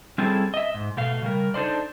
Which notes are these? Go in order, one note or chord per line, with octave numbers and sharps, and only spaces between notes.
G3 C4 C#4 E4 G#4 A4
D#5 E5
G#2
B2 A3 F5
C#3 G3 A#4
D4 D#4 A4 C5 D5